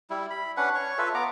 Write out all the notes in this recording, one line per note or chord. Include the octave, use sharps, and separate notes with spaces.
G3 E4
B5
C#4 D4 B4 F#5
C#5 C#6
F4 A4 B4 E5
B3 A#5 D6